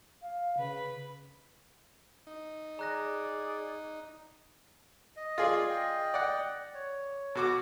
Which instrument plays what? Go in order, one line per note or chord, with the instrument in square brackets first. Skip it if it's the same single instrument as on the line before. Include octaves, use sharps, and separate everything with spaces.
[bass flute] F5
[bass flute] C#3 [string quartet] B4 B5
[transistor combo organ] D#4
[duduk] G#4 [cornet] D5 [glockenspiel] A#5 F#6 A#6
[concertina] D#5
[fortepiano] F4 G#4 D5
[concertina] D#5 G5
[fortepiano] D5 F#5
[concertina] C#5
[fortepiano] B2 F#4 D6